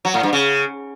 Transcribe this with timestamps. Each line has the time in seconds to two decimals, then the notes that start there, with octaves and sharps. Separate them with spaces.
0.05 F#3
0.14 A2
0.23 G2
0.33 C#3